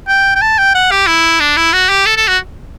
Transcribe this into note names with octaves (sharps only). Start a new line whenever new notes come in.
G5
G5
A5
G5
F#5
G4
E4
D4
E4
F#4
G4
A4
A4
F#4